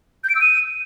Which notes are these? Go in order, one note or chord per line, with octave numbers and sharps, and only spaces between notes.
G6
D7
E6
D#7